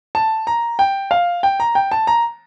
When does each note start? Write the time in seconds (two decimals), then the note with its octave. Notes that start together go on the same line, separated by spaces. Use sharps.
0.15 A5
0.47 A#5
0.79 G5
1.11 F5
1.43 G5
1.60 A#5
1.75 G5
1.91 A5
2.07 A#5